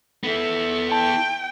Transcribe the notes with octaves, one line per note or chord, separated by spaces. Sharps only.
B3 E4 A4
G5 A5